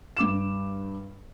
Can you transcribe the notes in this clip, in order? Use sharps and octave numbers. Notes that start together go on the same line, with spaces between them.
G2 D6 E7